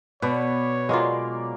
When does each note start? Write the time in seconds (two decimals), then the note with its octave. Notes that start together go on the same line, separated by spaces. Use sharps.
0.22 B2 B4 C#5 D5
0.89 F#3 G#3 A#3 F4 D5